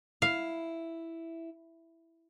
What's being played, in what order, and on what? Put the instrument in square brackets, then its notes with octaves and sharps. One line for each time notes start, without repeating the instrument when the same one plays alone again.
[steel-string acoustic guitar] E4 [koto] F5